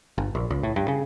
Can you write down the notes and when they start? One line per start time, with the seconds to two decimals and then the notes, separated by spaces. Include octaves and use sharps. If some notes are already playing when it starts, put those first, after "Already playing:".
0.18 G1
0.35 A#1
0.50 C#2
0.63 A2
0.76 G2
0.88 C#3